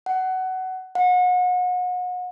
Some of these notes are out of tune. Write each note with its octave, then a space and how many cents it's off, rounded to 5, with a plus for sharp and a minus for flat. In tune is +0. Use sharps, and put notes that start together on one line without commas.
F#5 +20
F#5 -35